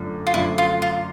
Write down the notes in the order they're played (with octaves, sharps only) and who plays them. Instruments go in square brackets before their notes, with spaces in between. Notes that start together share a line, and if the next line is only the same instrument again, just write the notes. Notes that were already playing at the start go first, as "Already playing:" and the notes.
Already playing: [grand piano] F#2 D3 F3 A3 D4
[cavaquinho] F4
[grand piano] F#2 D3 F3 A3 D4 [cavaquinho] E4
[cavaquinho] F4
F4